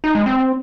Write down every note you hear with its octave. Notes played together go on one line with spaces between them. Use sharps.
D#4
G#3
C4